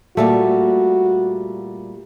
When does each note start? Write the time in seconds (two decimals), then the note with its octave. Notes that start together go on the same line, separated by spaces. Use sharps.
0.17 A#2 G3 A3 A#3 F#4